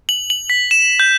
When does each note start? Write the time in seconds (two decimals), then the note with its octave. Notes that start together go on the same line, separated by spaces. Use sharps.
0.09 F#7
0.30 F#7
0.50 B6
0.71 E7
1.00 G6